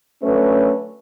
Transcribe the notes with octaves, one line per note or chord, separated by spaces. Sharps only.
D3 F#3 A3 C#4 B4